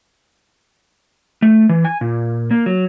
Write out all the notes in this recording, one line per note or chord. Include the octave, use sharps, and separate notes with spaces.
A3
E3
G#5
A#2
A#3
F#3